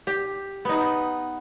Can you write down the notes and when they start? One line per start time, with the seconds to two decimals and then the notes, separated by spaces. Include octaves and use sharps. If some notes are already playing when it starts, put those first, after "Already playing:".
0.07 G4
0.65 B3 D#4